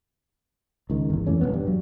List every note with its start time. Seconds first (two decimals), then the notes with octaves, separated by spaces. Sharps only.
0.90 C#2 D#3
1.10 G1 E2
1.27 F2 E3 A3 C#4
1.40 E1 B2 B3 C#4
1.54 G2
1.67 F#3